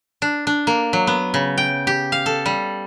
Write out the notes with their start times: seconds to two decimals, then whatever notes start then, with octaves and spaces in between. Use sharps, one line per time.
0.22 D4
0.47 D4
0.67 A#3
0.93 F#3
1.07 B3
1.34 C#3
1.58 G5
1.87 G4
2.12 F5
2.26 A4
2.46 G3